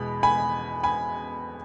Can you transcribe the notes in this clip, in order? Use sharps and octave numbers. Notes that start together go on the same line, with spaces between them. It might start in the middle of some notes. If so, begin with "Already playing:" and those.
Already playing: E2 B2 G#3 B3 B5
G#5 B5
G#5 B5